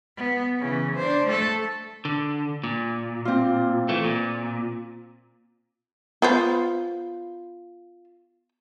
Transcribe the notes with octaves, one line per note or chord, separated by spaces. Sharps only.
B3
C#3 E3
D4 C5
A3 A4
D3
A#2
C4 F4
E3 A3
A#2
B3 F4 B4 C5